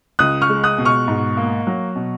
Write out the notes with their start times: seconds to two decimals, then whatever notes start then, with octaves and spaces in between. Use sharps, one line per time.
0.19 C#2 D#6 F#6
0.41 C#6 F6
0.49 G#3
0.64 D#6 F#6
0.78 B2
0.85 C#6 F6
1.08 G#2
1.37 A#3
1.67 F#3
1.96 B2